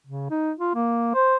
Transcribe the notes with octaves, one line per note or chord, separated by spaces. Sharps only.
C#3
D#4
F4
A#3
C5